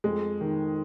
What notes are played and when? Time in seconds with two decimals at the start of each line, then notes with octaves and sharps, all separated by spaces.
0.04 F2 G#3
0.41 D#3